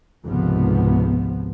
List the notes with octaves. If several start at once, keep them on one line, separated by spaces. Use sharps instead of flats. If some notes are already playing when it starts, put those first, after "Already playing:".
G#1 C#2 C3 F3 B3